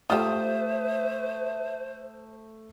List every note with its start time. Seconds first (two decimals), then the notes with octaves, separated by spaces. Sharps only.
0.10 A3 F4 G4 C5 E5 D#6